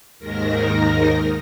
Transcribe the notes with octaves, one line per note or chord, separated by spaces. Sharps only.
D#2 G#2 D#3 A#4 A#5